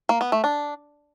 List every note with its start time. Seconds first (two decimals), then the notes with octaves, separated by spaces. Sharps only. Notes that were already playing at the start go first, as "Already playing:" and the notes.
0.09 A#3
0.21 B3
0.32 A3
0.44 D4